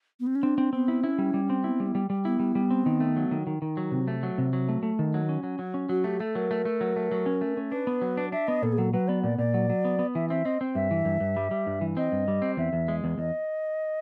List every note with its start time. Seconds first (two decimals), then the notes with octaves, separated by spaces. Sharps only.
0.20 B3
0.27 C4
0.35 C#4
0.43 C4 D4
0.58 C4
0.73 B3 C4
0.88 E4
1.03 C#4 E4
1.18 G3
1.34 G3
1.50 C4
1.64 B3 E4
1.80 G3 B3
1.95 G3
2.10 G3
2.25 B3 E4
2.40 G3
2.55 G3
2.71 C4
2.86 D#3
3.00 A3
3.16 F#3
3.31 D#3
3.47 D#3
3.62 D#3
3.77 F#3
3.91 C3 C4
4.08 A3
4.23 F#3
4.38 C3
4.53 F#3
4.68 A3
4.83 A3
4.99 D#3
5.14 F#3
5.29 C#4
5.43 F#3
5.59 F#3
5.74 C#4
5.89 F#3 F#4
6.04 A3 G4
6.20 A3 A4
6.35 F#3 A#4
6.51 A3
6.65 A3
6.81 F#3
6.96 A3
7.12 F#3
7.26 C#4
7.41 A3
7.57 C#4
7.71 D4 B4
7.87 B3
8.02 F#3
8.17 D4
8.32 D4 E5
8.47 B3 D#5
8.62 A#2 A4
8.73 G#4
8.78 F#3 A4
8.93 F#3 B4
9.08 B3 D5
9.23 A#2 D5
9.38 A#2 D5
9.54 F#3
9.69 F#3
9.85 B3
9.99 B3
10.15 E3 E5
10.29 C4 E5
10.45 C4 D#5
10.61 C4
10.75 G2 E5
10.91 E3
11.05 G2
11.20 G2
11.36 G3
11.51 G3
11.67 G2
11.81 E3
11.97 C4 D#5
12.12 G2
12.28 G3
12.42 C4
12.57 E2 E5
12.73 E2
12.88 G#3
13.04 E2
13.18 E2 D#5